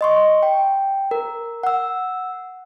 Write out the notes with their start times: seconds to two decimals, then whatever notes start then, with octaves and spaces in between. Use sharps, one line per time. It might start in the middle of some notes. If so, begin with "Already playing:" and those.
0.01 D#5 C6 C#6
0.43 G5
1.11 A#4
1.63 F#5 E6